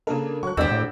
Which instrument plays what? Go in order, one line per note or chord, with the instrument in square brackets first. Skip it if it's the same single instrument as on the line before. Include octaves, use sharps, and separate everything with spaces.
[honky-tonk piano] C#3 A#3 D4 [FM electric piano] A4 A#4
[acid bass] F#3 [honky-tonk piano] C#6 F#6
[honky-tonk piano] G#1 D4 D5 [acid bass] E2 [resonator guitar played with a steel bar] C4 G4 [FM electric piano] E6
[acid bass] A2